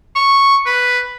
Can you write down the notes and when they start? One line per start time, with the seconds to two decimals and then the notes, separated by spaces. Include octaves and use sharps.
0.15 C#6
0.66 B4